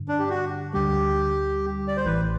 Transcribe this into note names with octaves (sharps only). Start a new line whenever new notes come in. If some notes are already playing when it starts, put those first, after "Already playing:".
Already playing: G2 D3
D4
G4
F#4
D2 D3 G3 G4
D5
C5
A1 A2 E3 B4